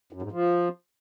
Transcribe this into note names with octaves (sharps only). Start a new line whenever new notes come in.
F#2
G#2
F3